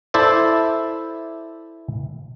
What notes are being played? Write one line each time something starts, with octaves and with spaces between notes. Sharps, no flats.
E4 A4 C5 D5 E5